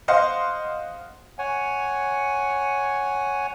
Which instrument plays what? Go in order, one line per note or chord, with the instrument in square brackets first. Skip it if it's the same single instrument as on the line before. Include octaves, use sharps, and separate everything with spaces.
[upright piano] C5 D#5 F5 F#5 C6
[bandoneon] C#5 F#5 G#5